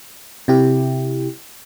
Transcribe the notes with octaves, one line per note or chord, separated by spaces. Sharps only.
C3 E4 G4